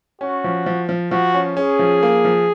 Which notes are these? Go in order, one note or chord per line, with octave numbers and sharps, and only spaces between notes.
C#4 F#4
F3
F3
F3
F3 F#4
C#4
C#4 G#4
F3
A#3
F3